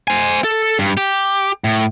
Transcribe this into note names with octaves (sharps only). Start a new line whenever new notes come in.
C5 G#5
A4
G2
G4
A2